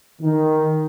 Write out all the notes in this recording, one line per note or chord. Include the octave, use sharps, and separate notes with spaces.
D#3